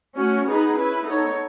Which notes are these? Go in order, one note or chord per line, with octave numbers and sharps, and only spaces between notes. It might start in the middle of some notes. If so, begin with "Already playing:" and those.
A3 C#4 F#4
B3 D#4 G#4 B4
C#4 E4 B4
B3 D#4 A4 C#5